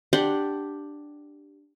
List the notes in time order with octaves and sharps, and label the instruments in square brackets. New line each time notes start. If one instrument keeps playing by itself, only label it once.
[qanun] D4 G4 F#5 C6